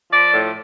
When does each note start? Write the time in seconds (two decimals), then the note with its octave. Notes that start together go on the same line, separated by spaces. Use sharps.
0.12 F3 D5
0.32 A2